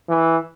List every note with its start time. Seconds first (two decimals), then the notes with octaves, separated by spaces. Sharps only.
0.09 E3